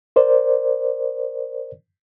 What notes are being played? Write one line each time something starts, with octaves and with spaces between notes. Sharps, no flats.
A#4 C5 D5